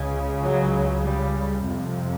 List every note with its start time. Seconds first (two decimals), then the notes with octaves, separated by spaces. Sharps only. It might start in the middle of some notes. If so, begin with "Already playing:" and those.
Already playing: C#2 C#3
0.45 F#3
1.05 G3
1.64 F2 C3